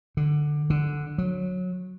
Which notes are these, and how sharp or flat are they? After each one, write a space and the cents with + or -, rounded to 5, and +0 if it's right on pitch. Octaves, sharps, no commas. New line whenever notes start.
D3 +15
D3 +5
F#3 -20